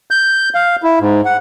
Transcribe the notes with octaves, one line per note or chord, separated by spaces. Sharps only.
G6
F5
E4
G#2
F#5